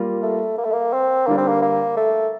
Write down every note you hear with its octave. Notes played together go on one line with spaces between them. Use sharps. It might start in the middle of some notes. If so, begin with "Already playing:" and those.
Already playing: G3 A#3 F4 A#4
A3
A#3
A3
A#3
C4
D3 G3 A#3 D4
C4
A#3
A#3
A3